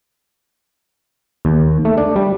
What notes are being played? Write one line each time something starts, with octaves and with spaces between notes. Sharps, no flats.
D#2
A3
D4
G3